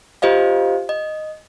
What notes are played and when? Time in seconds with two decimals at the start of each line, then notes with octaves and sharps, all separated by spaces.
0.22 F4 G4 C5 D#5 F5
0.89 D#5